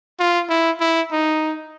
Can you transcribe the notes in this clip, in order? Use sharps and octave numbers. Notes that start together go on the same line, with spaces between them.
F4
E4
E4
D#4